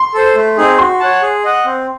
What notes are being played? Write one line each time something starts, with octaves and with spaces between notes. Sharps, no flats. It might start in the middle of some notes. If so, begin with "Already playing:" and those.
Already playing: C6
A4 C5
A3
C4 D#4 G#4
F#4 C6
C#5 F#5 A5
G#4
D#5 F#5
C4